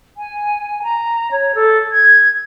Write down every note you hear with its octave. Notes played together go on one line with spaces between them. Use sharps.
G#5
A#5
C#5
A4
G#6